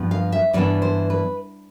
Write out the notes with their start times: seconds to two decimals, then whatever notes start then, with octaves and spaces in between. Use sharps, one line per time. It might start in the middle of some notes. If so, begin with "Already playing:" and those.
Already playing: G2 F3 B3
0.11 F5
0.32 E5
0.53 G2 E3 B3 D4 D5
0.82 C5
1.10 B4